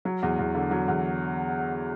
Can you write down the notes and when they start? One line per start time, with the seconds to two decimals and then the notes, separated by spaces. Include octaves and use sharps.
0.05 F#3
0.22 E2
0.39 E2
0.55 D3
0.71 F#3
0.88 E2